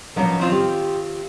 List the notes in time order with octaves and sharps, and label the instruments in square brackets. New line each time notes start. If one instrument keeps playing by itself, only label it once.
[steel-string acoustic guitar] F3 F#3 C#4 [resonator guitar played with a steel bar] A#3 B3 D#4
[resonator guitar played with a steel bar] D#3 C4 F4
[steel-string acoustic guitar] G4